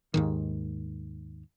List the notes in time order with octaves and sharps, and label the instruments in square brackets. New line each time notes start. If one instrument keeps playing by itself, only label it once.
[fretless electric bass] D#2 G#2 D#3